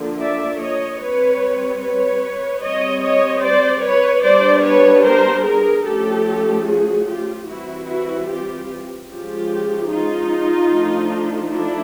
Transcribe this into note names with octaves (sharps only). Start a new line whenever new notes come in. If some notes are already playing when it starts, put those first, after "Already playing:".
Already playing: D3 F3 A#3
D5 E5
C#5 D#5
G3 C4 B4 C#5
B4 C#5
G3 C4 C#5 D#5
C#5 D#5
C5 D5
B4 C#5
G3 B3 D4 C5 D5
B4 C#5
A#4 C5
G#4 A#4
F3 A3 C#4 G4 A4
F#4 G#4
F4 G4
E3 G3 C4 E4 F#4
E4 F#4
F4 G4
F3 G#3 C#4 F4 G4
D#4 F4
F3 A3 D4
D4 E4